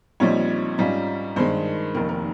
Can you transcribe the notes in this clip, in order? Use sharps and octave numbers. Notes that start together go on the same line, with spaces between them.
A#1 A#2 G3 C4 D#4 C#5
G#2 G3 C#4 F4 D#5
G2 D#3 G#3 C5
F1 D#2 D#3 A#4
A#4